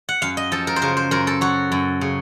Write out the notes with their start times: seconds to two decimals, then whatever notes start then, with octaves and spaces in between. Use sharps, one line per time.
0.09 F#5
0.22 F#2 F5
0.37 D#5
0.52 F3 A4
0.67 A#4
0.76 C5
0.82 C#3 A#4
0.97 C5
1.11 F#2 A#4
1.27 A4
1.41 F#3 F#4
1.72 F#2
2.01 C#3